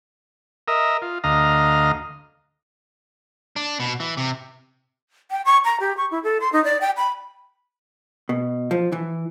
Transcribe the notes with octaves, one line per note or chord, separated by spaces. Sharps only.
A#4 D#5 E5
F4
D2 D#5 F5 A#5
D4
B2
E3
C3
G5
C#6
A#5
G4
C#6
E4
A4
C6
D#4
D5
G5
B5
B2
F3
E3